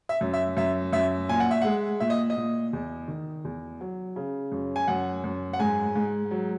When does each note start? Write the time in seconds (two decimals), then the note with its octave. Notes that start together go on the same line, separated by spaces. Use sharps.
0.09 E5
0.21 F#2
0.34 E5
0.57 F#2 E5
0.93 F#2 E5
1.29 A#2 G#5
1.40 F#5
1.51 E5
1.62 G#3 F#5
2.00 A#2 E5
2.10 D#5
2.30 D#5
2.36 A#2
2.73 E2
3.08 D#3
3.45 E2
3.81 F#3
4.16 C#3
4.52 F#2
4.76 G#5
4.88 F#2 F#5
5.24 F#2
5.53 F#5
5.59 G#2 G#5
5.96 G#2
6.31 F#3